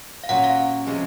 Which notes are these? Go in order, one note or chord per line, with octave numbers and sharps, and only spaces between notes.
F5
A#2 F#3 C#4 F#5
F5
C3 F3 G#3 C#4